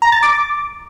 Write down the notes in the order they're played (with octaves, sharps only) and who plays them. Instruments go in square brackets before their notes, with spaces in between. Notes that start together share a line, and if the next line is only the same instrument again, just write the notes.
[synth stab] A#5
A6
D6